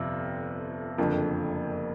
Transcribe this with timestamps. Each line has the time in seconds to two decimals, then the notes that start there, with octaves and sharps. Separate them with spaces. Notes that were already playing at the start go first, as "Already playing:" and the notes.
Already playing: G1 F2 C3
0.98 F#1 F2 D3